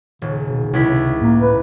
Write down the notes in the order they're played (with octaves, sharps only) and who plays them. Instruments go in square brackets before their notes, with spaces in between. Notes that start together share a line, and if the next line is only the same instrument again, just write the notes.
[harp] D#1 [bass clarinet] C#3
[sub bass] B2
[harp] C#2 E4 B6 [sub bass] C3
[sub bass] A2 [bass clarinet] A#3
[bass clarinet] B4